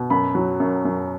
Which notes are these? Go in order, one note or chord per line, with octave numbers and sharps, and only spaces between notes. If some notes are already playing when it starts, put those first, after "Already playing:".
Already playing: B2
F#2 B5
F#3
F#2
F#2